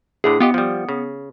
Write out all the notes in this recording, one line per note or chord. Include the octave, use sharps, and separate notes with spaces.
D2 A2 D3 G#4
B3 F4 G4 D#5
F3 G3
C#3